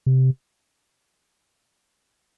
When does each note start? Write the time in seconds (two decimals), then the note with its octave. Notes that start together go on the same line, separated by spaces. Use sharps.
0.06 C3